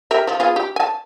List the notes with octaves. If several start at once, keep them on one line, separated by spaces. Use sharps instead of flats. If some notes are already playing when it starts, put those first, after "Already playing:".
G4 A#4 E5
F3
B3 F4 G#4
G4
G#5 A5